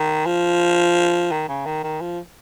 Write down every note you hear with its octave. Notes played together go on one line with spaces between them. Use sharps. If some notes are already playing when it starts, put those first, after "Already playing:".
Already playing: D#3
F3
D#3
C#3
D#3
D#3
F3